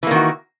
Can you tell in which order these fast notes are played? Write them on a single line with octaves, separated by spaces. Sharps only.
E3 A#3 D#3 F#4